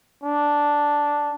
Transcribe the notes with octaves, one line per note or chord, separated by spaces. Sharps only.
D4